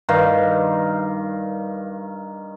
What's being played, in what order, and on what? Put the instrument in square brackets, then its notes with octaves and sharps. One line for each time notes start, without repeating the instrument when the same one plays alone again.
[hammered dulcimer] G2 D#3 F5